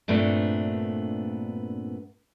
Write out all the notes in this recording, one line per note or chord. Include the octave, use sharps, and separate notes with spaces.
G2 A#2 A3 B3 C4 D4